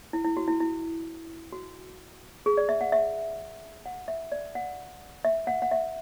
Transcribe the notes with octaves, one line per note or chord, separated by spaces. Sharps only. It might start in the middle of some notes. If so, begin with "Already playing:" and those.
E4
E4
F#4
E4
E4
F#4
G#4
D5
E5
F#5
E5
F#5
E5
D5
F#5
E5
F#5
F#5
E5